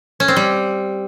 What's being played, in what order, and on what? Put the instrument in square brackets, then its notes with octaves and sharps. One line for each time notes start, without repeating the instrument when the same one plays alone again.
[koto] C#4
C4
G3